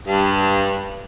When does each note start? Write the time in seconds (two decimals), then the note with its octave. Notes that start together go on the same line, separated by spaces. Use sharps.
0.07 G2